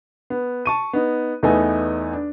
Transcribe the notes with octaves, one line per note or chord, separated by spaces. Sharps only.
B3
A5 C#6 D#7
B3 D#4
E2 A3 B3 D#4 A4 G#5
D4